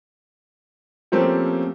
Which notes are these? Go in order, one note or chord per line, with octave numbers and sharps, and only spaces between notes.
F3 A3 A#3 C4 C#4 G4